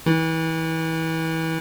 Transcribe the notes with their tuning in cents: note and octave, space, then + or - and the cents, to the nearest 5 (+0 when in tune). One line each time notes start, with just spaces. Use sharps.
E3 -30